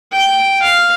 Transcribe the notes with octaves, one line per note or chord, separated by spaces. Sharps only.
G5
F5